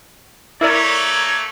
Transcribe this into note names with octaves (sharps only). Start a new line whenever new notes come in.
A3 A#3 E4 A#4 C#5 D5